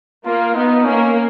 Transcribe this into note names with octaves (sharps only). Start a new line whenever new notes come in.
A#3 F4
B3 D#4
A#3 C#4